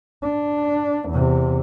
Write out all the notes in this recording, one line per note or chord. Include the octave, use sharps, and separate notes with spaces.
D4
E2 C3